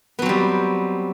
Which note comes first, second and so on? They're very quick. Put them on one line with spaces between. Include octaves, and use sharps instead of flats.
B3 F#3 C4 G3